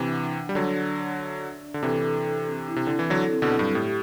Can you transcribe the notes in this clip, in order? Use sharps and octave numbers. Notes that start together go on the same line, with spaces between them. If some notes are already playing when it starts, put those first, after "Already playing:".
Already playing: C3 E3 D4
F#5
D4
G3
D3 F#3 F#5
D5
D5
E5
D4
D4
D3
C3 E3 A4
D4
D4
C4
E4
C3
D3 C4
E3
D3 F#3 A4
C4
B2 D3
F#3
G2
A2 G4